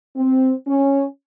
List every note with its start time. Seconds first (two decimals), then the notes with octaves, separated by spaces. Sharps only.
0.16 C4
0.67 C#4